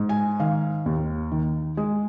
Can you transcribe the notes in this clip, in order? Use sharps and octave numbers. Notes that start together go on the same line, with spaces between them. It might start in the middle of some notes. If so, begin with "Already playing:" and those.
Already playing: G#2
G#5
D#3 F5
D#2
D#3
G#3